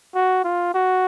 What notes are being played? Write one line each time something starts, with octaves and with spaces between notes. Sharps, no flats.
F#4
F4
F#4